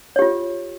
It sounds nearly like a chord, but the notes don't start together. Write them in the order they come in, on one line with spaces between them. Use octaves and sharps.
C#5 G4 F4